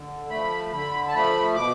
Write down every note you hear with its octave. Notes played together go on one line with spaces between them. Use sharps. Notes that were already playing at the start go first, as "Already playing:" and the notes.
Already playing: D3
F3 A3 B5
D3 B5
A5
F3 A3 B5
B2 D6